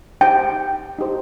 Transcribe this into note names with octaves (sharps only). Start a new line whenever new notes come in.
D#4 G4 C5 G5
D#4 G4 C5